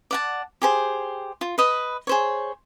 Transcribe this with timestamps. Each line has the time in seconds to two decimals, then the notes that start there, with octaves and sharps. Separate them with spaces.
0.11 D5 F#5 A5
0.62 G4 G#4 C5
1.41 F4
1.58 B4 D#5 B5
2.07 G#4 C5 C#5